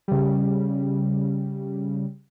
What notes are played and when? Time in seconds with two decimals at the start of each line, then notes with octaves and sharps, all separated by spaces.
0.08 C#3 G3